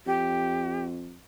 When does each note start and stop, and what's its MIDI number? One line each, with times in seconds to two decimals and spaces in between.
0.06 1.18 41
0.06 0.82 67